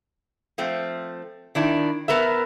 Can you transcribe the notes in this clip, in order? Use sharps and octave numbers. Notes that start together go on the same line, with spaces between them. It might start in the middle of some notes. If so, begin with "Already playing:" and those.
F3 A3 C4
D#3 D4 E4
B3 A#4 B4 E5